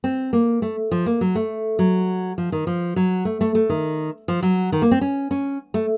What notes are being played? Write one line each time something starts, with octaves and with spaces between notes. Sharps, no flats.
C4
A#3
A3
F3
A#3
F#3
A3
F#3
F3
D#3
F3
F#3
A3
A3
A3
D#3
F3
F#3
D#3
A#3
C4
C#4
C#4
A3